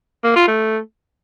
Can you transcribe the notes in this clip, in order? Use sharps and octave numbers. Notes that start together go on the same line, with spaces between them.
A#3
F4
A3